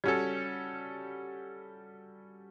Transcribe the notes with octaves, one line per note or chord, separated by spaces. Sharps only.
G3 C#4 F#4 A4